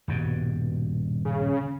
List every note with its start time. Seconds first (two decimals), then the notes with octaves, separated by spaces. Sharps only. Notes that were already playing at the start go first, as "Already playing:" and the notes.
0.08 D#1 G2 B2
1.25 C#3